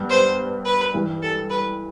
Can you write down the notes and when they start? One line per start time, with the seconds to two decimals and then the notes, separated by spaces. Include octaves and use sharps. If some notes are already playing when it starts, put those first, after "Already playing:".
Already playing: G2 G3 B3
0.10 C5
0.65 B4
0.94 G2 E3 G3
1.22 A4
1.50 B4